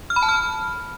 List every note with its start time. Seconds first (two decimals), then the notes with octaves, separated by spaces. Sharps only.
0.10 F6
0.16 B5
0.22 A5
0.29 F6